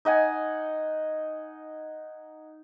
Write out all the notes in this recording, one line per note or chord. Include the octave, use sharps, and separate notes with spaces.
D#4 D#5 F#5 G#5